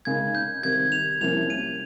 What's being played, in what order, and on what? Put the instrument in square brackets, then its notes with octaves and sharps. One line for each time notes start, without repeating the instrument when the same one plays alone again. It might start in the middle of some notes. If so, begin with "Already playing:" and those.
[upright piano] C#3 G#3 D#4 A#4 [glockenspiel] G#6
[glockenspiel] G6
[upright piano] C3 D#3 G3 [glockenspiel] G#6
[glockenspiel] F7
[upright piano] C2 C3 F3 A#3 C#4 [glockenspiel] F7
[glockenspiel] D#7